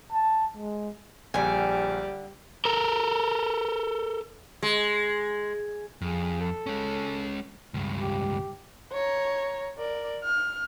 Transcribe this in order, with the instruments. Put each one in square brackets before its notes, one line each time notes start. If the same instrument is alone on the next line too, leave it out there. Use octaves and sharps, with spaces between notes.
[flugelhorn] A5
G#3
[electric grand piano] A#1 [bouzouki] D3 G5 [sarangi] G3 [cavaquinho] G#5
[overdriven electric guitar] A4 A#4
[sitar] G#3
[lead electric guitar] F2 [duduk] G#4
[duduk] A4
[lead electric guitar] G#3 C#4
C#2 G2
[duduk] G4
[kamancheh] C#5 A#5
A#4 D5
F6